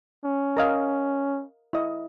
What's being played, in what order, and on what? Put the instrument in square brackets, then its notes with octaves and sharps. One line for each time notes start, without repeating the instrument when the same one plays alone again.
[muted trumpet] C#4
[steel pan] A#4 D#5 F5
E4 D#5